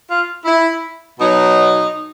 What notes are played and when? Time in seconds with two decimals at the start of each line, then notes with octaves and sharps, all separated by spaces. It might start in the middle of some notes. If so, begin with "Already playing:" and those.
0.08 F4
0.45 E4
1.20 B2 F#3 D#4